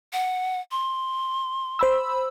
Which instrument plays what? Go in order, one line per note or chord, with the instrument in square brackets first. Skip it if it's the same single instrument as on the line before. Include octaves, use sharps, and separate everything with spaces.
[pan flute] F#5
C6
[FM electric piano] C5 B5 E6